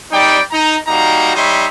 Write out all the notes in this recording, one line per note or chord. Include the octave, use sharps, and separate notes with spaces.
G3 C4 D#4 D5 G5
D#4 A#5
G3 A#3 D#4 F#4 A#5
G3 D#4 C#5 E5 C6